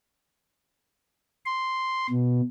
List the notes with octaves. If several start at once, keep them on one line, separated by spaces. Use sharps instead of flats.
C6
B2